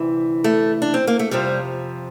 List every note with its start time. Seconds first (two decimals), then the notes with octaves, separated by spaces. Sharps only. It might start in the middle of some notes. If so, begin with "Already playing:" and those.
Already playing: D2 C3 E3
0.44 A3
0.82 D4
0.94 C4
1.07 A#3
1.19 A3
1.31 F2 C3 F3 G3